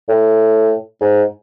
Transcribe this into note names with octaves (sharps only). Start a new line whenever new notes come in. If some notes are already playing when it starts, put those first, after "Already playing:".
A2
G#2